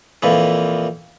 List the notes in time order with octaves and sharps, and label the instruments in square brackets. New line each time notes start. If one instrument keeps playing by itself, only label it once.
[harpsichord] F2 A#2 E3